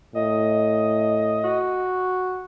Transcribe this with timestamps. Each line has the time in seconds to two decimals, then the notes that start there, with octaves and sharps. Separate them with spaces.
0.15 A2 D#5
1.44 F#4